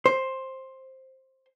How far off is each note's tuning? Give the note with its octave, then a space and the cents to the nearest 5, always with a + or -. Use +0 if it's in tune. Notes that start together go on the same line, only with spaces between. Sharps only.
C5 +10